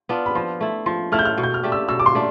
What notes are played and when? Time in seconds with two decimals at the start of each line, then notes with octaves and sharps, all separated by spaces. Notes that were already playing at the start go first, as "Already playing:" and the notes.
0.09 B3 D4 F4
0.26 B5
0.35 F3 C6
0.61 A3 E4
0.86 F3 C6
1.12 A3 E4 F6
1.19 G6
1.25 F6
1.38 B2
1.43 G6
1.54 F6
1.63 A3 D4 G4
1.72 E6
1.89 B2 E6
2.00 D6
2.06 C6
2.15 A3 D4